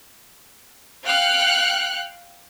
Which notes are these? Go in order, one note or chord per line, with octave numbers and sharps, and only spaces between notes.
F5 G5 F6 F#6 C#7